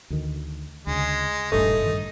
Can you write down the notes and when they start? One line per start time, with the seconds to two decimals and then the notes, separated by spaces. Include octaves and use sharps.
0.10 D2 D#3
0.87 D2 C#3 G#3
1.52 E1 A#1 G2 A3 D#4
1.82 G2 D#3